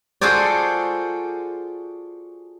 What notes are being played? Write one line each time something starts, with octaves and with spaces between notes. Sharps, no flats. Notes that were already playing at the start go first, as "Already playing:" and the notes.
F4 F#4 G#4 A4 C5 D5